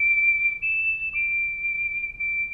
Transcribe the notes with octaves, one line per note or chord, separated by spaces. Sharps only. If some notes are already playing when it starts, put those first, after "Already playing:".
Already playing: D7
E7
D7
D7